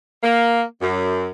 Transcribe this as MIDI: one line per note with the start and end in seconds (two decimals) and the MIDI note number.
0.23 0.62 58
0.81 1.31 42